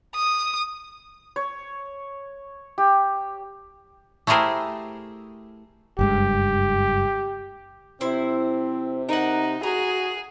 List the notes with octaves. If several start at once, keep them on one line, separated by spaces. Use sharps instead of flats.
D#6
C#5
G4
A3 E4 G4 G#4 A#4 C5
F#1 G2 G#3 G4
C3 C4 E4 C5
D#4 A#4 F#5
F#4 G#4 A#5